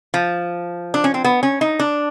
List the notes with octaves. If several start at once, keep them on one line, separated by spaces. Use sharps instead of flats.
F3
D4
C#4
C4
B3
C#4
D#4
D4